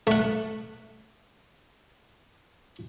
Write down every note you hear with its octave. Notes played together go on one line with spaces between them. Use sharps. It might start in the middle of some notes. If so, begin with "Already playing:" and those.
A3 F#5